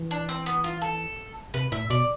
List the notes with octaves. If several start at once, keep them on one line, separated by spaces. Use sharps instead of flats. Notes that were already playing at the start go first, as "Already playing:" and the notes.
Already playing: E3
D4
C4
B3
F4
A4
C3 B4
A2 E5
B2 D5